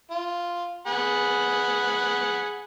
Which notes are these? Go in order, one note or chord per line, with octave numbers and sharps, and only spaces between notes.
F4
G#4 F#5 B5